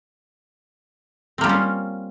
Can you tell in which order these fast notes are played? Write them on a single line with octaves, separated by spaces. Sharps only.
C4 A#3 G3 F4 C#4